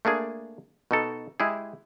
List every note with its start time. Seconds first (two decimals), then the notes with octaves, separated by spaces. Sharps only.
0.05 A3 A#3 D4 G#4
0.91 B2 D#4 A4
1.40 G#3 E4 G4 G#4